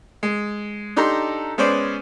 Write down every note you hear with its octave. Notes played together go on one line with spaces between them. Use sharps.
G#3
D4 D#4 G4 A4 A#5 C6
G#3 B3 C#4 C5 D5